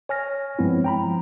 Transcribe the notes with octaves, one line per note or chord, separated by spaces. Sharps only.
C#5 G#5 F6 A#6
G2 F3 G#3 B3 C4 E4
G5 A#5 B5
F3